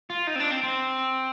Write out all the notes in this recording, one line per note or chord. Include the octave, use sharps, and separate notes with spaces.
F4
D#4
C4
D4
C4
C4